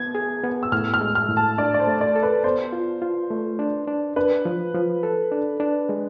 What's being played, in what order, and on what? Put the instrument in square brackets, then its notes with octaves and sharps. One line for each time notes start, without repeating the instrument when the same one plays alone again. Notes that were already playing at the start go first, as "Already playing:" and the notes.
Already playing: [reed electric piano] B3 [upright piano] G#6
[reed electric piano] G#4
B3
[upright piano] E6
[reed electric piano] A2 [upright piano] F6
[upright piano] F6
[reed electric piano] G#3
[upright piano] F6
[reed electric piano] A2
[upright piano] A5
[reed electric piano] D4 [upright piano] D5
[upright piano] D5
C5
[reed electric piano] A3
[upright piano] D5
[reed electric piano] A4
[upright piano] B4
[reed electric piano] B3 [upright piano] C5
[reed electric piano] F4
F4
A3
D4
D4
[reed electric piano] D4 [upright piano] B4
[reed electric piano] F3
F3
A4
D4
D4
G#3